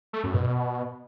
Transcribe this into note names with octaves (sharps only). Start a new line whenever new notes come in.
A3
F#2
B2